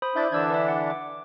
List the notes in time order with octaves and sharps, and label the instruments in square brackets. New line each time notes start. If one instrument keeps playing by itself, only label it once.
[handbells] C5 B5 D#6
[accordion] D4 E4 [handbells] E5 G6 A6
[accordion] D3 E3 D4 [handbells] A5 E6 G#6
[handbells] B4 E5
F#5
D6